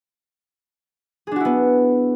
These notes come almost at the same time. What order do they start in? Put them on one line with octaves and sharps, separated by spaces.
G#4 D4 F#4 E4 B3